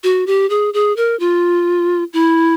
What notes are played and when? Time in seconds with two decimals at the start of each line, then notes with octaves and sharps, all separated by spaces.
0.04 F#4
0.27 G4
0.50 G#4
0.74 G#4
0.97 A#4
1.20 F4
2.13 E4